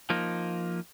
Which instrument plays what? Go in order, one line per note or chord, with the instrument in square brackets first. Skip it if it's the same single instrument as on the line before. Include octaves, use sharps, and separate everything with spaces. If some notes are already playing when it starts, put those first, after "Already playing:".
[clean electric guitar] F3 A#3 D#4